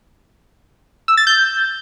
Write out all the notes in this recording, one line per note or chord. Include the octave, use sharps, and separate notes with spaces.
E6
A6
G6